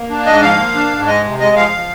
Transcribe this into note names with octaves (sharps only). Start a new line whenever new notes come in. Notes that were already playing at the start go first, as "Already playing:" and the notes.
Already playing: A#3
D4
G#2 D#5
F3 F5
A#3
D4
G#2
G#3 D#5
C3
G#3 D#5
F3 F5
F3